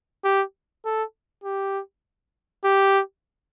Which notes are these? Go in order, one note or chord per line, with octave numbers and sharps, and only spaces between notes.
G4
A4
G4
G4